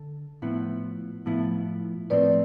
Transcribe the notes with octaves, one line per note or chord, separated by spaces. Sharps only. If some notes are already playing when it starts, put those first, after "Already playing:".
Already playing: D3 A4
A2 F3 B3 E4
A2 F3 B3 E4
A2 F3 C4 B4 D5